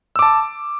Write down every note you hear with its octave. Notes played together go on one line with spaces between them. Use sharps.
A5 D6 E6